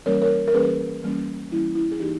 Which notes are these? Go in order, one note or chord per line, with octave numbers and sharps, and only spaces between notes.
E3 G3 A#3 C#4 A#4 C#5
A#4 C#5
A#4
E3 G3 A#3 C#4 G#4 B4
E3 G3 A#3 C#4
E3 G3 A#3 C#4 E4
E4
G#4
E3 A#3 D#4 G4